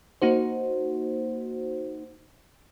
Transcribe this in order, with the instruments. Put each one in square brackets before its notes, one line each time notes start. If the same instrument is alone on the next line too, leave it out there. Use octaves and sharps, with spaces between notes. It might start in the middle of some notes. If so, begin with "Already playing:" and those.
[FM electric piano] A#3 D#4 F#4 C5